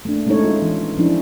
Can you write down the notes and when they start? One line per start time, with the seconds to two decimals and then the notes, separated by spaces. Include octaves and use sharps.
0.05 A3 A#3 D4
0.27 G#3 A3 C#4 D#4 A4 C#5
0.44 F4
0.62 E3
0.98 F3 C#4 D4 E4